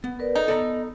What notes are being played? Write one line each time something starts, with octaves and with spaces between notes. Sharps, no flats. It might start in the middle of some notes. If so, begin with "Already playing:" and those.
B3
A#4 B4 D5
D#4 A4
B3 A4 D5 A#5